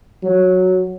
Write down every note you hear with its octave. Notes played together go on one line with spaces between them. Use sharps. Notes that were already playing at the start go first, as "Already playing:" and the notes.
F#3